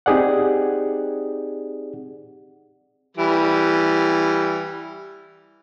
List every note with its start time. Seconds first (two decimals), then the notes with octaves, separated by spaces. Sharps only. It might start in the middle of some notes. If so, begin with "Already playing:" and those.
0.06 C4 D#4 G4 G#4 D5 F#5
3.17 E3 G3